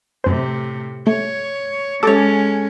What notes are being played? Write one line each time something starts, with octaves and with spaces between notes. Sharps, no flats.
F#2 A2 C3 C5
A3 C#5
G#3 C#4 A4 C#5 D6 E6